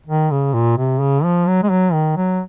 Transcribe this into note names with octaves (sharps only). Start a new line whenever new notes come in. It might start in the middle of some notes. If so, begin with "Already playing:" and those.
D#3
C#3
A#2
C3
C#3
F3
F#3
G#3
F#3
D#3
F#3